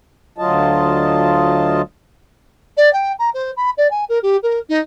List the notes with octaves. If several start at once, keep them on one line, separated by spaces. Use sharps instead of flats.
D2 F#3 F4 D#5 A5
D5
G5
A#5
C5
B5
D5
G#5
A#4
G4
A#4
D#4